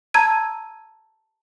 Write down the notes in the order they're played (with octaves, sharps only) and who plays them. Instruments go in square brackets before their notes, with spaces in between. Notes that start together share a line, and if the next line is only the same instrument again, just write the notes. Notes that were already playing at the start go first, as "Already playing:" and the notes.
[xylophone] A5 A#5 E6 G#6 D#7